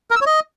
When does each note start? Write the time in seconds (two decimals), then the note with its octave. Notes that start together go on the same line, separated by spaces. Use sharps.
0.11 A#4
0.16 E6
0.21 C#5
0.26 D#5